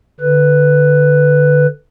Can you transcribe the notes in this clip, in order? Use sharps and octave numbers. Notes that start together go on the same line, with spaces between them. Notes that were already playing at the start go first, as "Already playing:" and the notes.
D3 B4